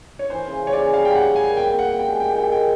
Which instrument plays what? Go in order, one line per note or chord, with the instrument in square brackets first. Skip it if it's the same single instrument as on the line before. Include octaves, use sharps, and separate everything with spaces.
[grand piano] C#5
[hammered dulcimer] E3 [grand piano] C5
[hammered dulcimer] C#3
C#3
[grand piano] C#5
[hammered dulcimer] C#3 [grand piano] D5
[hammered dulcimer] G3 [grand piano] F5
[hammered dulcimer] G3 [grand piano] G5
[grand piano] F#5
[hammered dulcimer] G3
[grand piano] G#5
[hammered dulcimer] A#3
[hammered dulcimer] C4 [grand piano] G5
[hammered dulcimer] C4
[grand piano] F#5
[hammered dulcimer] F4
[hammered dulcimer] G#3 [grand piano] G5
[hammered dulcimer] D#3 [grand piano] G5
[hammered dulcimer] D#3 [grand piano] G5
[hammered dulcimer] C4 [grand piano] G5